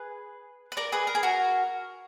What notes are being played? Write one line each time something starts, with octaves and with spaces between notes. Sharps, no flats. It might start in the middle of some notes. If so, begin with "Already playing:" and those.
Already playing: G#4 B4
B4
A#4 D5
G#4 B4
A#4
G#4
F#4 A#4